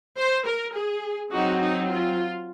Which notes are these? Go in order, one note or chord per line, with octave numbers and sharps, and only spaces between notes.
C5
A#4
G#4
F#3 C4 D#4 F#4
D#4
F4